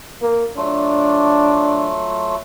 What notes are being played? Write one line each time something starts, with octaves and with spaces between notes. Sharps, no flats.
A#3
F#3 A3 D4 F4